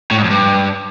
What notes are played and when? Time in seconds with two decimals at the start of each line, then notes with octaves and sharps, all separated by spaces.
0.11 A2
0.17 G#2
0.24 F2
0.30 G2